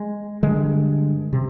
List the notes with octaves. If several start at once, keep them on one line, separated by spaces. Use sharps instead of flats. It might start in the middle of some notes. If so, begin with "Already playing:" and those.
Already playing: G#3
G2 D3 G#3
C3